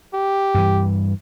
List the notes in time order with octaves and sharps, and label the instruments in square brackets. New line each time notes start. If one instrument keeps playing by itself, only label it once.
[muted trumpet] G4
[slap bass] G2 E3